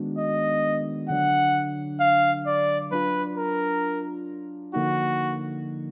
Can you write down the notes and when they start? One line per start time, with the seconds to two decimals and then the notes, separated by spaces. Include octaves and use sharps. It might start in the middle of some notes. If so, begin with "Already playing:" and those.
Already playing: D#3 G#3 B3 D4 F#4
0.18 D#5
1.09 D3 F#3 D4 F#5
2.00 F5
2.46 D5
2.91 F#3 D4 F4 B4
3.38 A#4
4.74 D3 F3 A#3 D#4 F#4